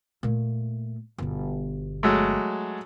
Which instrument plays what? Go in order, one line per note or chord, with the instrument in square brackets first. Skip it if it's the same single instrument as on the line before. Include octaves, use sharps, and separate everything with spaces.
[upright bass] A#2 A3
G1 B2
[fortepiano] F#3 G#3 A3